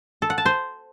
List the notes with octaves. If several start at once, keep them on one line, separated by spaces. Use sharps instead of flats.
A4
F#5
A5
C5